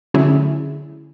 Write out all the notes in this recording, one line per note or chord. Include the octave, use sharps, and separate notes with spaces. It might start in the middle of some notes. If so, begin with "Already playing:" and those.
D3 F#3 A3 C#4 E4 G#4